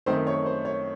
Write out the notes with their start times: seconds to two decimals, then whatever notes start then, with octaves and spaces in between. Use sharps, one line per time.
0.06 F#2 D#3 A3 C4 D#4 C5
0.27 C#5
0.46 C5
0.65 C#5